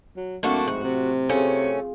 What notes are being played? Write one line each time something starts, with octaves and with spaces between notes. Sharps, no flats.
F#3
A2 F#3 A3 A#3 C4 D4 F#4
G#2 F#4
C3
A3 C#4 F4 G#4